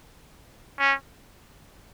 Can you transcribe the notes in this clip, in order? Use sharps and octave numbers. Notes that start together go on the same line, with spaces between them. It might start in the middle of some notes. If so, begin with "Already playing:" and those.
C#4